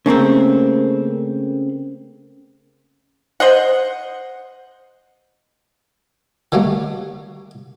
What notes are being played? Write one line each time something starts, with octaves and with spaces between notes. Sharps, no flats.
C#3 A3 A#3 C4
C5 D#5 F#5
D#3 F#3 G3 A3 A#3